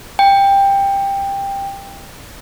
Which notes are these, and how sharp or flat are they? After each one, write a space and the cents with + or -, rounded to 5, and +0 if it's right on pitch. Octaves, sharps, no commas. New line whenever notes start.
G5 +15